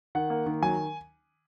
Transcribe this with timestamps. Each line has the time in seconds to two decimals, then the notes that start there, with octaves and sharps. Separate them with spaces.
0.15 D#3 F#5
0.30 A#3
0.46 D#3
0.63 F#3 G#5